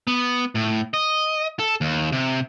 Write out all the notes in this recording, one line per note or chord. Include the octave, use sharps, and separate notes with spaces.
B3
A2
D#5
A4
D#2
C3